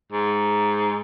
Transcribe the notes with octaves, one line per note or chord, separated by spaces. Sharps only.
G#2